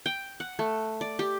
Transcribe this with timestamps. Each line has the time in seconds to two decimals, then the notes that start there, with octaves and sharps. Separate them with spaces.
0.06 G5
0.40 F#5
0.59 A3
1.01 D5
1.19 G4